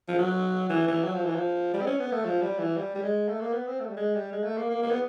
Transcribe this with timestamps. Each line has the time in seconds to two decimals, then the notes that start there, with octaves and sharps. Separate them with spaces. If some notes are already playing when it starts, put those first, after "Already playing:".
0.08 F3
0.18 F#3
0.69 E3
0.87 E3
1.04 F#3
1.14 F3
1.25 E3
1.35 F3
1.74 G3
1.81 C4
1.86 C#4
1.99 B3
2.12 A3
2.25 F3
2.42 G3
2.59 E3
2.77 G3
2.95 G3
3.03 G#3
3.29 A3
3.41 A#3
3.53 B3
3.67 C4
3.80 A3
3.89 G3
3.96 G#3
4.15 G3
4.32 G#3
4.44 A3
4.58 A#3
4.70 A#3
4.83 A#3
4.91 B3